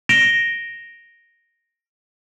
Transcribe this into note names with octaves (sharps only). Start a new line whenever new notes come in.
A#6 D7 E7 F7 G7